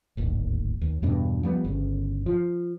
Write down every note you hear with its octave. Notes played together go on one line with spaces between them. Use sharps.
D1 G#1 D#2
D#2
E2 G2 B2 D4
F3 G3 B3
G1 C#3
F3